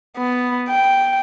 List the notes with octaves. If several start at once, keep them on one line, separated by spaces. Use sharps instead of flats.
B3
G5